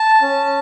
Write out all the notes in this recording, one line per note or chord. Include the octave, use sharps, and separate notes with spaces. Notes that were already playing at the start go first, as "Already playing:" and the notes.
Already playing: A5
C#4